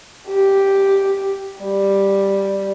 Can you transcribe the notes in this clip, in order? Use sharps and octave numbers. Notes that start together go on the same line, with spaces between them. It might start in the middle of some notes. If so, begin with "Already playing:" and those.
G4
G3